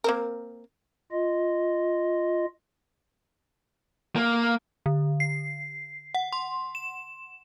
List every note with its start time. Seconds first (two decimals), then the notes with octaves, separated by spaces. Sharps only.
0.04 A#3 C4 A#4
1.12 F4 D#5
4.16 A#3
4.86 D3
5.20 C7
6.15 F#5
6.33 C6
6.75 E7